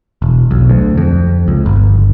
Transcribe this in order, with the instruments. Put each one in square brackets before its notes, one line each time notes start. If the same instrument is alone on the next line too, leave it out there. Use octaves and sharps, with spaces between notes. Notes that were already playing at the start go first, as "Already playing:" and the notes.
[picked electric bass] E1
B1
D2
F2
C#2
G1